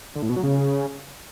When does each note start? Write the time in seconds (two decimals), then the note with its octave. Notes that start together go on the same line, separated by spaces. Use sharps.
0.16 D3
0.22 A2
0.29 B2
0.36 F#3
0.43 C#3